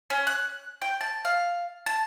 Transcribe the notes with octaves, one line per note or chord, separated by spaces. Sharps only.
C#4
F#6
G5
A5
F5
A5